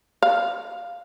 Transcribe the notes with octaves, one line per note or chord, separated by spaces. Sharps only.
F5